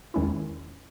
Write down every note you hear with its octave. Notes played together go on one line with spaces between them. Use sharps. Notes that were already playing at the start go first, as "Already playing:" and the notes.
E2 D#3 G#3 C#4 E4